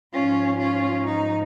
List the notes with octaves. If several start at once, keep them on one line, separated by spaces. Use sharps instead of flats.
G#2 F3 C#4 F4
C#4 F4
D#4